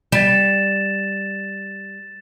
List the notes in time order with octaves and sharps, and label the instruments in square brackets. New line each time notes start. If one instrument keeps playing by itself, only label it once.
[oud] G3 [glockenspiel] A6 E7